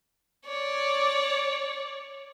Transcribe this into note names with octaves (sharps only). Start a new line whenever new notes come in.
C#5 D5